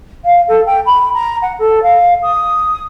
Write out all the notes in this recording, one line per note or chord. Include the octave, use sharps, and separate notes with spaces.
F5
A4
G5
B5
A#5
F#5
A4
F5
D#6